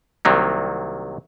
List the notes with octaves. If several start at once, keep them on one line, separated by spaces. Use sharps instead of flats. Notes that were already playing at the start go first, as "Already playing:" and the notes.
C2 C3 D#3 F#3 A#3